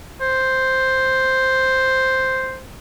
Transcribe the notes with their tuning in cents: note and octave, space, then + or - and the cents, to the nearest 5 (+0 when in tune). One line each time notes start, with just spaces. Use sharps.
C5 +0